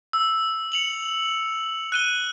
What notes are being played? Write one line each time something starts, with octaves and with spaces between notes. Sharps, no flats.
E6
C#7 F7 F#7
F#6 D#7 G7